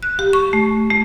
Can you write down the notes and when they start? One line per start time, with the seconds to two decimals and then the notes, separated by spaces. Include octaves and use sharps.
0.03 F#6
0.19 G4
0.33 C#6
0.53 A3
0.91 A3